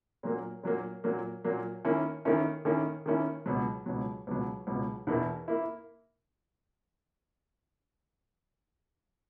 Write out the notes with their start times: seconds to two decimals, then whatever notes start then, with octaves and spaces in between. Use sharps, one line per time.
0.23 A#2 F#3 A#3
0.63 A#2 F#3 A#3
1.04 A#2 F#3 A#3
1.44 A#2 F#3 A#3
1.85 D#3 A#3 C#4 E4
2.25 D#3 A#3 C#4 E4
2.65 D#3 A#3 C#4 E4
3.06 D#3 A#3 C#4 E4
3.46 C#2 B2 F#3
3.86 C#2 B2 F#3
4.27 C#2 B2 F#3
4.67 C#2 B2 F#3
5.07 E2 B2 A#3 E4
5.48 A#3 E4